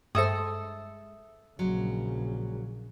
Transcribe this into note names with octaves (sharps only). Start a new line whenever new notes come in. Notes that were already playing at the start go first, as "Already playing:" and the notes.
G2 G#3 A4 C5 E5 D#6
A#1 C#3 F#3 G#3